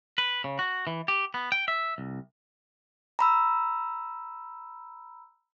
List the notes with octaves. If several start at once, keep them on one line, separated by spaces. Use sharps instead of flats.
B4
C#3
F#4
E3
G4
B3
G5
E5
C2
A#5 B5 E6